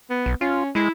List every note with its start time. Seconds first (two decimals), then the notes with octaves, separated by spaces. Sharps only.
0.10 B3
0.26 B1
0.41 C#4 F4
0.75 G#3 E4